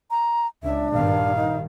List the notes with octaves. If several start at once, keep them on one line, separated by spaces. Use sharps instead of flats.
A#5
C#2 D4 E5
A#1 G2 D#3 F5
D#4